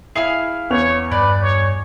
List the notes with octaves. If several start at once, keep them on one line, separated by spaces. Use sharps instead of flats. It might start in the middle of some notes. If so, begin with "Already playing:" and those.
E4 G#4 F5 F6
E2 B3 C#5 F7
G2 B4 D5
C#5